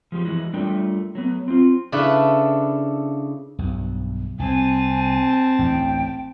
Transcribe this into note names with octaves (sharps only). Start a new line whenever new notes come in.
F3 G#3 G4
E3 G#3 E4 F#4
G3 A3 D4 F4 A#4 G5
F#3 A3 B3
C4 F4
C#3 D4 E4 A4 B4
B1 G2
C2 C4 G#5 A5
A1 D2 A2 G5